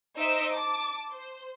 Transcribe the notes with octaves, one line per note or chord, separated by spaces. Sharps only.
D#4 C5 D#5 E5 E6 D7
A5 D6
C5